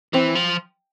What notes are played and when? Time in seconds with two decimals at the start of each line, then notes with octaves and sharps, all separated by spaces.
0.13 E3 C4
0.35 F3